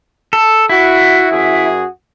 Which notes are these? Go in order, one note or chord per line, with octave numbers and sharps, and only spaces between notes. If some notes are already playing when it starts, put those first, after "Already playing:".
A4
E4 F#4
F#2 F#4 G#4